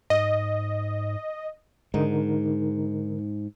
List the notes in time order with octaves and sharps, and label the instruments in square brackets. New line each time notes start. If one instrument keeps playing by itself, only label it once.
[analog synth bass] G#2 [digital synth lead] D#5
[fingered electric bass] G#2 [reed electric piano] D3 D#4 A#4